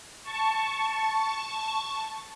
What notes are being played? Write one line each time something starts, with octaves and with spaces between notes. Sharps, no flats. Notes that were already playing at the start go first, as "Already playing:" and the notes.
A5 C#6